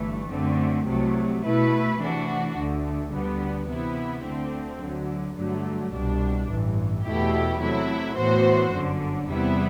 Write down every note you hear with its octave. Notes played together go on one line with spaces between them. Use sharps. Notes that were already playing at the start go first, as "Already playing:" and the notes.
Already playing: G1 G2 E3 A3
F#2 D3 A3 C4
C2 C3 F#3 A3
B2 A3 E4 B4
C3 E3 A3 D4 F#4
D2 D3 A3
D2 D3 G3 B3
C3 E3 B3 E4
D2 D3 A3 C4
D2 D3 F#3
G2 D3 F#3 A3
C2 B2 G3 D4
A1 G2 E3
E2 B2 A3 E4 G4
C3 F#3 A3 E4
A2 E3 B3 F#4 C5
G1 F#2 D3
E2 C3 G3 B3 E4